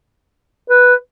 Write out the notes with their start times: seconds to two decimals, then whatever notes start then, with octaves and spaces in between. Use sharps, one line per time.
0.70 B4